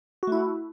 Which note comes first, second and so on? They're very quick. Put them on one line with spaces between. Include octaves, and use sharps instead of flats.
F#4 A3 E4